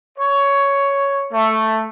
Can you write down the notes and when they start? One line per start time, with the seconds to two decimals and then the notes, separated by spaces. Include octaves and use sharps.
0.19 C#5
1.32 A3